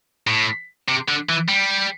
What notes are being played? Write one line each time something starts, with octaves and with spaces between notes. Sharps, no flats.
A2
C3
D3
E3
G3